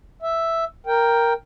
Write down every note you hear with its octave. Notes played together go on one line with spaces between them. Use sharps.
E5
A#4 G5